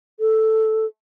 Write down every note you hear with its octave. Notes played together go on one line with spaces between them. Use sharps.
A4